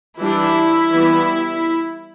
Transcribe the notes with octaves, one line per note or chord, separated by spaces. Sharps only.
E3 G3 D4 E4
E3 G3 B3